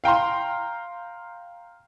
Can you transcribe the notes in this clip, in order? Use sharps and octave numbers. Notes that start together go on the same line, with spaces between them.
F5 G5 A#5 C6